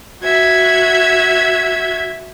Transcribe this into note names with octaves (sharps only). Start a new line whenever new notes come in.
F#4 E5 G#6